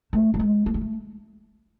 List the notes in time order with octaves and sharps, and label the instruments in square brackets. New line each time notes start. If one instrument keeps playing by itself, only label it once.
[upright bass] A3
G3
G#3
A3
G#3
A3